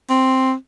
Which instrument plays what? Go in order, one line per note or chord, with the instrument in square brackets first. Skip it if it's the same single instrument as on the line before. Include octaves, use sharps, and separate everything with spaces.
[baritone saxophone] C4